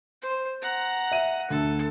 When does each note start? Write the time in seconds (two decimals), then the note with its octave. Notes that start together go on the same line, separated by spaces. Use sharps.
0.22 C5
0.62 F#5 A#5
1.12 E5 D#7
1.50 D2 A4